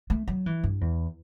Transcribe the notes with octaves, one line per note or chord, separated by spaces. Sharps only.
A3
F#3
E3
G2
E2